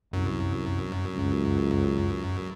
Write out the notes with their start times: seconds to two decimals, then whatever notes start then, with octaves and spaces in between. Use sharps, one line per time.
0.13 C2 F#2
1.16 C#2